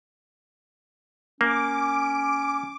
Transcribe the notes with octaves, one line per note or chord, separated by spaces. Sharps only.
A#3 C#4 D6